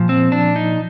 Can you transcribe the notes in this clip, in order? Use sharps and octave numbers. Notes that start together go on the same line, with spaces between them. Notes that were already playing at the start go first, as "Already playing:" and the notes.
Already playing: A#2 F3
C4
D4
D#4